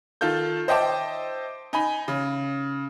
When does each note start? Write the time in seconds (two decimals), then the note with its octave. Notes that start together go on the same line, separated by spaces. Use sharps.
0.21 D#3 F4 A4 G6
0.68 C5 D#5 E5 G5 A5 D6
1.73 D#4 G#5 B5
2.08 C#3